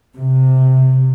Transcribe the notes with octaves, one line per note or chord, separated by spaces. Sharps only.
C3